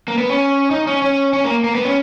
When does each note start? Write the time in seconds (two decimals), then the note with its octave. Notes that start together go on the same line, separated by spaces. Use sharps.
0.08 A#3
0.18 B3
0.29 C#4
0.71 D#4
0.87 C#4
1.02 C#4
1.33 C#4
1.44 A#3
1.64 A#3
1.75 B3
1.85 C#4